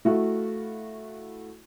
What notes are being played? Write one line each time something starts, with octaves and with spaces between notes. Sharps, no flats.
A3 E4 F#4 F5